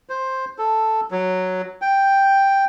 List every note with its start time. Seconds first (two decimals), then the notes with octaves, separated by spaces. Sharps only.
0.09 C5
0.58 A4
1.11 F#3
1.82 G5